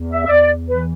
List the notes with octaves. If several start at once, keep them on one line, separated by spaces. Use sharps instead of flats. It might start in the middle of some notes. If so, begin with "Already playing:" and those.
Already playing: E2
E5
E5
E2 D5
E3 B4